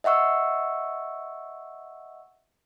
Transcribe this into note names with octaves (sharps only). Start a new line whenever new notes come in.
D#5 E5 F#5 C#6 E6